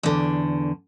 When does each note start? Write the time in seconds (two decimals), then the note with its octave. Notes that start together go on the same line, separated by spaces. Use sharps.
0.03 E2 D3